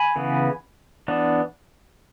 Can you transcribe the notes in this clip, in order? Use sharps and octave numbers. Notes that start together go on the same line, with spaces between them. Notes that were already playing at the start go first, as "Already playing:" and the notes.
Already playing: G#5 B5
C#3 E3 B3
E3 B3 D4